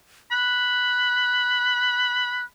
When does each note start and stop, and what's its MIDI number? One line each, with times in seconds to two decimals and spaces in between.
0.32 2.46 83
0.32 2.44 90